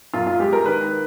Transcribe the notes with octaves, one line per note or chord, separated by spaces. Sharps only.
F#2 F4
F4
G#3 G4
A#4
D#3 B4